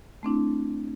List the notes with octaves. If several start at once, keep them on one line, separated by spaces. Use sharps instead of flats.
A3 C4 D4 E4